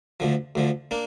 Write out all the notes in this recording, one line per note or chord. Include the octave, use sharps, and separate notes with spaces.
D2 D3 F3
D2 D3 F3
A#3 D4